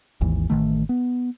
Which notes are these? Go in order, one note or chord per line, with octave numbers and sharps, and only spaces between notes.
G#1 D#2 E3
A1 B2 D#3 A3
B3